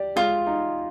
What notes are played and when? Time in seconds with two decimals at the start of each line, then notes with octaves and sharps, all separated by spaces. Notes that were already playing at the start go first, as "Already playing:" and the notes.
Already playing: G4 D5
0.16 G#3 F4
0.47 D#4